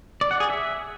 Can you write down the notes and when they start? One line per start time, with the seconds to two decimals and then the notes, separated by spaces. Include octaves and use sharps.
0.21 D5
0.31 F#5
0.40 G#4
0.50 E5